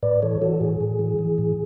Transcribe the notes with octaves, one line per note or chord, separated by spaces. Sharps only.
A2 B4 D5
E3 A4 C#5
E3 F#4 A4
A2 G#4
A2
E3
E3
A2